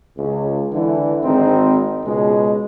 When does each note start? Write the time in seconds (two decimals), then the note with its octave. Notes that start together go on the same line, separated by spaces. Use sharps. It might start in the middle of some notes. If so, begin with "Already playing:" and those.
0.18 C#2
0.72 D3 E3
1.24 G#1 C4 D#4
2.05 C#2 B2 G#3